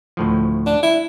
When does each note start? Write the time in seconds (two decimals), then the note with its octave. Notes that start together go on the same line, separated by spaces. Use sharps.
0.17 D2 A2 F3
0.66 D4
0.82 E4